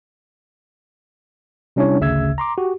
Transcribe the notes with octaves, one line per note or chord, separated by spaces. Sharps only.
C3 G3 C#4 D4 E4 C#5
G#1 D2 C#3 E5 E6 G#6
A#5 C6 D6
F#4 G4